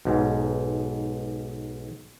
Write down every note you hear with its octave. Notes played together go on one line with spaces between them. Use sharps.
B1 G#2